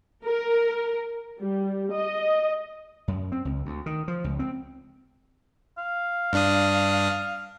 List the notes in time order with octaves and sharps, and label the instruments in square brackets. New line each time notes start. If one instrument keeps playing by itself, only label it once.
[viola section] A#4
G3
D#5
[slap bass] F#2
C4
C#2
D2
D#3
F3
C#2
C4
[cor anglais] F5
[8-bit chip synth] G2 D4 D#6